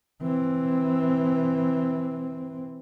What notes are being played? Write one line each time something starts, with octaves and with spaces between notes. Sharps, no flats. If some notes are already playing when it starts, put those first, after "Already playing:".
E3 C4